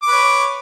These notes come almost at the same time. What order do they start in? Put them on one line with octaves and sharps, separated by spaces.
D6 B4 C#5